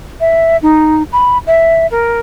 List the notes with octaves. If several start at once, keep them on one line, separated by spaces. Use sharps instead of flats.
E5
D#4
B5
E5
A#4